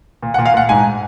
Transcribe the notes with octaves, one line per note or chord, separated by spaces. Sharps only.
A#2
F#5
A#2
F5
A#2 F#5
G#2 G#5